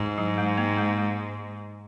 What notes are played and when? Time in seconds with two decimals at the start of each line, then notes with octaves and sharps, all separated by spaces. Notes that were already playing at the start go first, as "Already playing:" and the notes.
Already playing: G#2
0.18 F#3
0.38 G#3
0.58 A#3
0.77 G#3
0.98 G#3